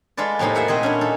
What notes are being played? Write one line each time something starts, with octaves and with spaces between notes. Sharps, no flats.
G#3 F4 A4 B4 D5
F2 A2 C3 A#3 D#4
G#4 E5 F#5 B5
A#2 C4 G#4 D#5
C#4 D4 E4
D#4 A4